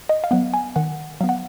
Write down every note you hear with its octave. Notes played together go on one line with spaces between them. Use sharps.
D#5
F5
F#3 B3 F#5
G#5
D#3 F#5
F#3 B3 F5
F#5